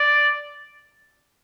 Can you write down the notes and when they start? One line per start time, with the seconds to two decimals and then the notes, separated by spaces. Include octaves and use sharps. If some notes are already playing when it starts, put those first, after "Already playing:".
Already playing: D5